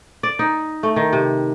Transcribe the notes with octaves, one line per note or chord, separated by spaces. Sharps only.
D5
D#4
A3
D#3
C3